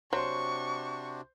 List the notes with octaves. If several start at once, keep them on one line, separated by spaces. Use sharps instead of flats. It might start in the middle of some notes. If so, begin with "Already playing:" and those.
C3 F#3 D4 F#4 C5 C6 C#6